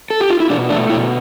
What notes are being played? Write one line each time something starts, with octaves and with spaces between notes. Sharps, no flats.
A4
G4
F4
E4
B2 D4
A3 D4
B2 E4